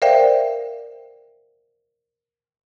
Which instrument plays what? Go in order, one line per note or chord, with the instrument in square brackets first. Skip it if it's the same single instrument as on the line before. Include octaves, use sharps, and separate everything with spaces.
[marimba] A#4 C5 D5 E5 F5 G5